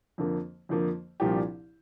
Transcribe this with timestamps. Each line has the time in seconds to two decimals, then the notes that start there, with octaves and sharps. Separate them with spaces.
0.18 F2 D3 F3 A#3
0.69 F2 D3 F3 A#3
1.20 C2 A#2 F3 D4 G4